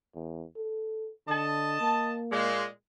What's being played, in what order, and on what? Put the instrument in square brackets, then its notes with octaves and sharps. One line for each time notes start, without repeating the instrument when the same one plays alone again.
[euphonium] E2
A4
[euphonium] D3 [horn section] D#5 A5
[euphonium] A#3
[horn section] A#2 G#3